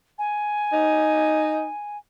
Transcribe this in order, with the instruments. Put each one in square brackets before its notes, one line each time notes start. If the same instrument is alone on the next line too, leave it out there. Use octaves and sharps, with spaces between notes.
[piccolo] G#5
[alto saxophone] D#4